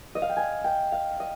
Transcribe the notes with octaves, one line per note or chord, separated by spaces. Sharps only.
D#5
F5
G5
G#5
G5
F5
D#5